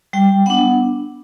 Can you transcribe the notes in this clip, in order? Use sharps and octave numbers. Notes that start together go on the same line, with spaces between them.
G3 G5
B3 D4 F#5